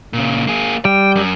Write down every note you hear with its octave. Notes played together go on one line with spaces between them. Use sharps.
A#2 C#3
A#3 G#4
G3 G5
F#2